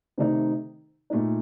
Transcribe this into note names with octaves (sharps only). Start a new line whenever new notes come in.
C3 D#3 A3 D#4
A#2 A3 D#4